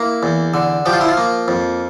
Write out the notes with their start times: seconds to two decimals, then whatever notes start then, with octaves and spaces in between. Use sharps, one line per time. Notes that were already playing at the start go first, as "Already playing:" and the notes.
Already playing: A#3 E4
0.23 E2
0.54 D3
0.86 F3 G4
0.93 F4
1.01 E4
1.08 F4
1.17 A#3
1.48 F2